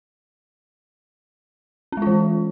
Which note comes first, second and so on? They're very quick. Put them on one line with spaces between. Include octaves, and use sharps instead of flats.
C#4 G#3 F4 E3